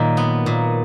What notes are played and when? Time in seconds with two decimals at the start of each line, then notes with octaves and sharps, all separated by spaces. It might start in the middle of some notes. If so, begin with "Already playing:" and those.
Already playing: A#2 D#3 F#3
0.17 B3
0.46 A#2